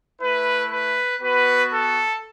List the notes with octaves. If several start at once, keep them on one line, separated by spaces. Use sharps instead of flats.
A3 E4 B4
B4
B3 F#4 B4
A4